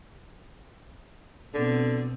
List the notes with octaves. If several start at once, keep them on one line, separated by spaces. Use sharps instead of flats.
B2 D3 C4